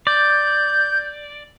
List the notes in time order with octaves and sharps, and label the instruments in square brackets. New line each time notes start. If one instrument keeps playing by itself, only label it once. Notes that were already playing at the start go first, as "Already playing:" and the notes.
[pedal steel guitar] D5 [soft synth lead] G6